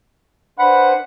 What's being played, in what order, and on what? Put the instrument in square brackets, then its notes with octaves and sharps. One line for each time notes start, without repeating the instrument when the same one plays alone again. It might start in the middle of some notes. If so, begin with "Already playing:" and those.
[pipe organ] D4 B4 C5 [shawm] F#5 [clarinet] B5